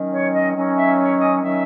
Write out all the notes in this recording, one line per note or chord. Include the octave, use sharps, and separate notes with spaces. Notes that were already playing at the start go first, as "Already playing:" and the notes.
Already playing: D#3 F#3 C#4
C#5
D#5
D#3 F#3 C#4
E5
C#5
D#5
D#3 F#3 C#4 E5